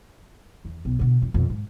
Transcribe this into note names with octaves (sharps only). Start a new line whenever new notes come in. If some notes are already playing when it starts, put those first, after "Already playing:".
E2
B1
B2 D3
F2
F2 B2
G#2